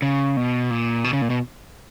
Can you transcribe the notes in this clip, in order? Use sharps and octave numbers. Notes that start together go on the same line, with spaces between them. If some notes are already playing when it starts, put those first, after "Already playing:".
C#3
B2
A#2
B2
C#3
A#2
B2